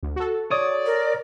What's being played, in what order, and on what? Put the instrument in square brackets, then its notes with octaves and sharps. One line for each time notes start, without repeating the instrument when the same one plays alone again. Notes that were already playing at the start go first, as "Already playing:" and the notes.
[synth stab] D2
F#4 A4
[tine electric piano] C#5 D#6 [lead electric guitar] D5
[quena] A#4